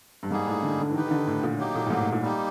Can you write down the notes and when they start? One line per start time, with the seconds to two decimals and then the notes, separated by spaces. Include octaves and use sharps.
0.23 G2
0.31 G#2 G3 A#3 D#4 G#4
0.47 A2
0.63 D3
0.80 D3
0.90 E3
0.94 D#3 D#4 G4 B4
1.07 D#3
1.11 D3
1.27 A2
1.43 A#2
1.58 F#3 A#3 D#4 G4
1.75 A#2
1.86 A2
1.90 G#2
2.01 A2
2.12 A#2
2.22 G3 A#3 D#4 G4